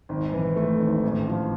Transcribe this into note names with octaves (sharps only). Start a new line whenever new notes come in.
G#1
E3
A3
G#1
A1
F3